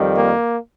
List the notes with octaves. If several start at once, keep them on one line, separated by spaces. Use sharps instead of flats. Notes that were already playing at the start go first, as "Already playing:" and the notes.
Already playing: F2 D#3 G3
A#3